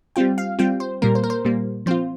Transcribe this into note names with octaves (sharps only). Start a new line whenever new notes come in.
G3 C4 F4 G5
F5
G3 C4 F4 G5
C5
A#2 G3 A#3 A#4
C5
A#4
C5
A#2 G3 A#3
F3 C4 F4 C5